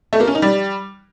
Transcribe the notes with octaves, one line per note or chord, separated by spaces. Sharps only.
A3
A#3
C#4
D#4
G3